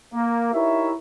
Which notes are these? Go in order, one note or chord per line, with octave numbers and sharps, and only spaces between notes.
A#3
D#4 E4 G4 A#4 C#5 E5